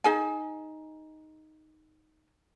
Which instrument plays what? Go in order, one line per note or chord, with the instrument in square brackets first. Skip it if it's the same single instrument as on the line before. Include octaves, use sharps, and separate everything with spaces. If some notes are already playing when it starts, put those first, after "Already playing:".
[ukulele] D#4 G#4 G#5